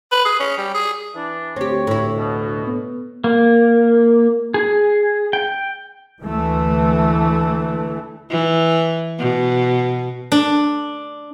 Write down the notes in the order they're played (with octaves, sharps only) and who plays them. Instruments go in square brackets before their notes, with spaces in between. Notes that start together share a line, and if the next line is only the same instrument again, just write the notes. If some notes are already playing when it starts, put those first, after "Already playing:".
[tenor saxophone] B4
G#4
C#4
G3
G#4
[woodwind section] E3 D4
[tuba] D2 [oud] C4 G4 [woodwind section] C#5
[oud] A2 E4
[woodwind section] B2
[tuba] B3
[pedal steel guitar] A#3
G#4
G5
[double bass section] D2 E3 A3
[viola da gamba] E3
B2
[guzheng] D4